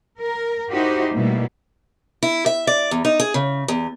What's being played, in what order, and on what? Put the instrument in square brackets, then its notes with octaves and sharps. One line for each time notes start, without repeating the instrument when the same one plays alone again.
[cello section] A#4
D#4 E4 F#4 G4 C5
B2 G3 A3 A#3 E4
[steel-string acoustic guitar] E4
E5
D5
E2
D#4
G#4
C#3
E2